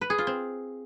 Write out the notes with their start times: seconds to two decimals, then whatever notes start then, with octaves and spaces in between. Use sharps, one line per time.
0.01 B4
0.10 G#4
0.18 F4
0.27 C4